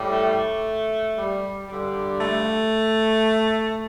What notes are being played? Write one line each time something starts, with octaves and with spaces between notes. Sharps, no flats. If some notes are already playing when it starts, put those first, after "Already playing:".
Already playing: A2 G3
A3
G3
G2 D3 G3
A3